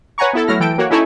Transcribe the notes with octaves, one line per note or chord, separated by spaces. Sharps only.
B4 C#5 F#5 G#5 A#5 C#6
B3 E4 A4
F#3 A3 E4 F6 A#6
E3 A4 G5 D7
A#3 F#4 C#5
C#4 D#4 E4 A4 C#5 G#5